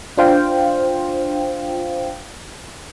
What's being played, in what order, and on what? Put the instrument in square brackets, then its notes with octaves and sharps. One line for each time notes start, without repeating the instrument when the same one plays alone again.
[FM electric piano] D4 F4 C5 F5 G5